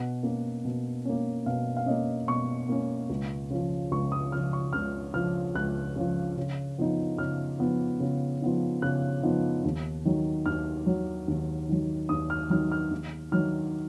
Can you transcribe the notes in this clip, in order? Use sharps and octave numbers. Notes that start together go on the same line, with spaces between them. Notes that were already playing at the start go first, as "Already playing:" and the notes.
Already playing: B2 F#5
A#3 C#4
B2
A#3 C#4
B2 F5
F5
A#3 C#4 D#5
B2 C#6
A#3 C#4
C#2
C#3 F3
C#2 C#6
D#6
C#3 F3 F6
C#6
C#2 F6
C#3 F3 F6
C#2 F#6
C#3 F3
C#3
F3 B3 D#4
C#3 F6
F3 B3 D#4
C#3
F3 B3 D#4
C#3 F#6
F3 B3 D#4
D#2
D#3 F#3
D#2 F6
D#3 F#3
D#2
D#3 F#3
D#2 D#6
F6
D#3 F#3 F6
F6
D#2
D#3 F#3 F6